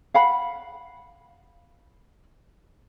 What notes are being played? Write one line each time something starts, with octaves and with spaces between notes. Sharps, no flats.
F5 F#5 B5